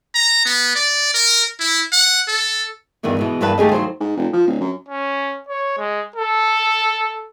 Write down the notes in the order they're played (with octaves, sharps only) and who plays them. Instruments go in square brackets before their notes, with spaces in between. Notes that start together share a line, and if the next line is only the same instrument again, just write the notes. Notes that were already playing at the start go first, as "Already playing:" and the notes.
[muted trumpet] A#5
B3
D5
A#4
E4
F#5
A4
[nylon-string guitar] E2 G2 B2 D#3 E3
B2 E3 G#3
E2 G2 A#3 B4 A5
D#2 A3 G4 G#4 D#5
D#2 C3 F#3 C5
[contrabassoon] G#2
F1
F3
D1
F#2
[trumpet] C#4
C#5
G#3
A4